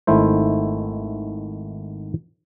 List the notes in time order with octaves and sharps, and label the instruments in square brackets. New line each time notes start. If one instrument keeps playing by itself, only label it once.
[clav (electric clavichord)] G#1 D#3 A3 E4 C5